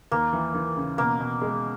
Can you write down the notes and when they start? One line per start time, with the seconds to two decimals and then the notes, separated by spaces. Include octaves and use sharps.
0.12 D#2 A#3
0.33 E3
0.55 E3
0.77 C#3
0.98 B2 A#3
1.19 B2
1.42 G#3